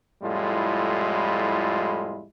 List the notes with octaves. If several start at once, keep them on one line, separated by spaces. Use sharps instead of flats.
F2 A2 G3 G#3 E4 F4